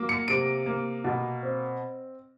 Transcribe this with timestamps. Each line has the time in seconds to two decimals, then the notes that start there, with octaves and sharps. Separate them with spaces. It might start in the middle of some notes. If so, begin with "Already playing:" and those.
Already playing: F#3 A#3
0.09 C#7
0.28 C3 D7
0.66 A#3
1.04 B2
1.43 C4